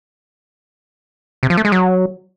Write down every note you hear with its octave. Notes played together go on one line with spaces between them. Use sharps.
C3
F3
A3
G#3
F#3